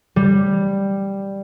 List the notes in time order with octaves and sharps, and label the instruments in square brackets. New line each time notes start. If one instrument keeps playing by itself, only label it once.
[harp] G3